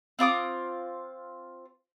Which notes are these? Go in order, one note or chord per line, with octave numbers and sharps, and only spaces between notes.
C4 F4 D6 D#6